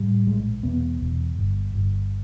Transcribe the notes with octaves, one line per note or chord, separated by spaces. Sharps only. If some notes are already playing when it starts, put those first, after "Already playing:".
Already playing: A2 G3
A#1 G#3
E1 B3
E1
G1
G1